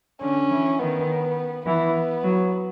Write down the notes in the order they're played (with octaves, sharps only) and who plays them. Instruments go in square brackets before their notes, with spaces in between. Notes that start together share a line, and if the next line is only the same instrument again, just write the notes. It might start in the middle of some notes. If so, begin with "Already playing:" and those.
[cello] D3 [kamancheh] C#4
[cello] E3
[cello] D#3 [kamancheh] B3
[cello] E3 [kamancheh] B3
[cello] F#3